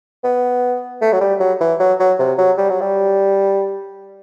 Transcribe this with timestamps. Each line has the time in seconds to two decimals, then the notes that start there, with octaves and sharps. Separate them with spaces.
0.24 B3
1.01 A3
1.12 F#3
1.21 G3
1.40 F#3
1.61 E3
1.80 F#3
2.00 F#3
2.19 C3
2.38 F#3
2.58 G3
2.70 F#3
2.81 G3